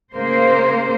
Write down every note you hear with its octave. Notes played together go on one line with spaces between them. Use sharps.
C#3 A#3 C5